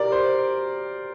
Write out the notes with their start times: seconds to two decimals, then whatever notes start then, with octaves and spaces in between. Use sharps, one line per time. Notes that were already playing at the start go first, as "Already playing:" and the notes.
Already playing: G4 A#4 D5
0.12 C5